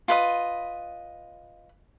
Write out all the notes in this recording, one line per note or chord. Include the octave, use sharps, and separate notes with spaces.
F4 B4 D#5